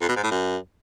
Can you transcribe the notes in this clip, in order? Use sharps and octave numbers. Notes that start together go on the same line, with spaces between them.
F2
B2
G#2
A2
F#2